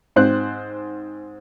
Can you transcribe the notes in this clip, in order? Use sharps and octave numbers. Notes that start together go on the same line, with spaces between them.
G#2 C4 C5 F#6